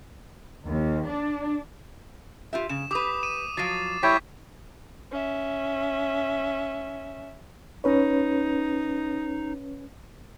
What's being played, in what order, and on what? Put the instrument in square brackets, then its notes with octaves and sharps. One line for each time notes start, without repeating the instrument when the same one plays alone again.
[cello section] D#2
D4
[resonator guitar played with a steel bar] F4 G4 E5
[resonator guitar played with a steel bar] C#3 [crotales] E7
[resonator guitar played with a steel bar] G4 B4 [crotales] D6 D#6
[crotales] D#7 E7
[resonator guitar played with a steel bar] F3 F#3 [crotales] A6 C7 D#7
[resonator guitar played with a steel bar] G3 [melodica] E4 C#5 G5 [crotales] G#6 B6
[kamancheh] C#4 E5
[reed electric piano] C#4 B4 C#5 [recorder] D#4